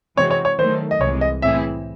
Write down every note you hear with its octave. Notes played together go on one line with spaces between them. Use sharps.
C3 E3 G#3 C4 F#4 C#5
C#5
C#5
D#3 F#3 A3 C5
D#5
C2 C3 E3 G#3 C#5
D#5
A2 E3 C4 E4 G#4 E5